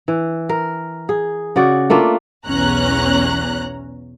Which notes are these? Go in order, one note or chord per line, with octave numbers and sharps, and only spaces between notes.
E3
A#4
G#4
C#3 F#4 D5
A3 A#3 D4 F4
B1 E2 C#4 A#5 F#6